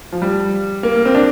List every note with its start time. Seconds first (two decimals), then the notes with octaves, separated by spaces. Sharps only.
0.12 F3
0.22 G3
0.83 A#3
1.05 C4
1.15 D4